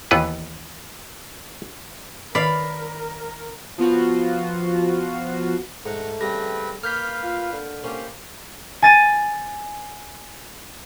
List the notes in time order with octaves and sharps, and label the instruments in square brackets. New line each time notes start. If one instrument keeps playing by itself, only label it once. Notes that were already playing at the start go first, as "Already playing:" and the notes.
[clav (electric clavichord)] D#2 E3 B3 B4
[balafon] D#3 B4 [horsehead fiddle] A#4 [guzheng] D5 F5 [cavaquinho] B5
[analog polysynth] F3 B3 F4 F#4
[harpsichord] G#2 [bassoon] A3 [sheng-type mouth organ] F#5 A#5
[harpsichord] C#3 G3 [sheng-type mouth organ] C4 B4 [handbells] A#6
[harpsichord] A#3 [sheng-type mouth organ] B4 F5 [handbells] F6 G6 B6
[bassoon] F4
D3
[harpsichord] A#3 C#4 [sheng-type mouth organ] G4 C5
[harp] G#5 A6 D#7